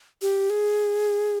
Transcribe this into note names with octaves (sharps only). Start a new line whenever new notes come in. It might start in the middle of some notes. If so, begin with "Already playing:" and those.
G4
G#4